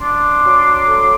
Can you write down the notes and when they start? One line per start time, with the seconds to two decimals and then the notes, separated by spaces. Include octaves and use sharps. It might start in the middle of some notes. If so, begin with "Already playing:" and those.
0.01 D4 C6 D6
0.45 F#3
0.87 A3